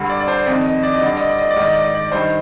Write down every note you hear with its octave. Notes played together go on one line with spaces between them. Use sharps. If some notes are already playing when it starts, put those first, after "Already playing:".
Already playing: G2 D3
D5
D5
C5
F2 D#3 D5
D#5
D5
D#5
G2 D3 D5
D#5
D5
D#5
D5
G#2 D#3 D#5
D5
D#5
D5
G2 D#3 C5